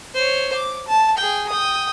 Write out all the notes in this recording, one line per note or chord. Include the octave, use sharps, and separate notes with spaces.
C5 C#5
D6
A5
G#4 G5
G5 D#6